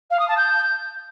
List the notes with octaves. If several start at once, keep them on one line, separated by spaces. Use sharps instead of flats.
F5
D#6
A5
G6